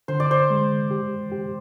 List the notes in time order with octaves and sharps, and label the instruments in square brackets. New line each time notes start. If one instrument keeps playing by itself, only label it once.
[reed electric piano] D3 [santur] C5
[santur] D5
C5
[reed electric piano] G#3
G4
G4